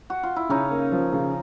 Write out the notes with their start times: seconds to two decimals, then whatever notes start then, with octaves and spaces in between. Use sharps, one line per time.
0.10 F#4
0.23 F4
0.36 E4
0.49 C#3 C#4 D#4
0.71 A#3
0.92 F3
1.13 C#3